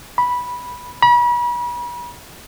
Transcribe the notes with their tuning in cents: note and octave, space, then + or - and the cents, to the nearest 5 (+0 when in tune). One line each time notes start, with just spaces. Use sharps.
B5 -10
B5 -40